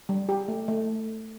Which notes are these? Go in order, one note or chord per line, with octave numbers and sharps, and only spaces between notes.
G3
G4
A3
A3